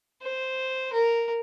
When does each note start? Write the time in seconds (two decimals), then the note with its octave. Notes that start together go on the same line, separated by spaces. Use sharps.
0.22 C5
0.92 A#4